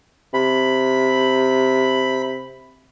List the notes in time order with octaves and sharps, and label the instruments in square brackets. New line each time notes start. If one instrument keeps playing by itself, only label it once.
[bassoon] C3 [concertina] B5